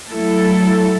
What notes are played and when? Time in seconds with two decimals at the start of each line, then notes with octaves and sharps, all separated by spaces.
0.10 F#3 A3 E4 A4